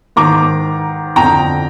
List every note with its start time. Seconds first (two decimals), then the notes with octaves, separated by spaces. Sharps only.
0.16 G#2 D#3 A#5 D6
1.16 F2 D3 G5 A#5